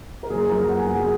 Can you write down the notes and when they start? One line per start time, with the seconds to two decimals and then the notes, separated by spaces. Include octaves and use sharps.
0.23 A#4
0.30 F#1 G#4
0.49 F#2 F3 B3 A#4
0.68 F#1 F#5
0.78 G#5
0.87 F#2 F3 B3 F#5
0.96 G#4